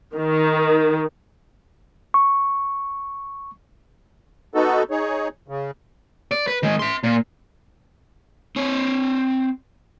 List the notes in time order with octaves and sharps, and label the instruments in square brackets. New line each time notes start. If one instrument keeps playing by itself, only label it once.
[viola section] D#3
[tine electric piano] C#6
[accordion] B3 D#4 F#4 A4
D#4 G#4 C#5
C#3
[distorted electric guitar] D5
B4
D#3 G#3
E5 C6
A#2
[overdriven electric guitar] C4 C#5